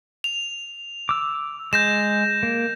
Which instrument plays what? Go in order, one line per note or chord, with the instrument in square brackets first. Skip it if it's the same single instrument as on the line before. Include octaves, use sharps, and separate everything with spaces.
[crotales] F7
[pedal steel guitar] D6 E6
[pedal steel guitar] G#3 [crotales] G6 A#6 E7
[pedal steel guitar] A#3